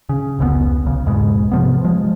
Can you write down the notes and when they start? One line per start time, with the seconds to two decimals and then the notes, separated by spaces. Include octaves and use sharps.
0.09 C#3
0.39 F1 C#2 B2 B3
0.86 B1 C#3
1.06 E2 G#2 B2 G#3
1.51 C3 F3 B3
1.84 F3 G#3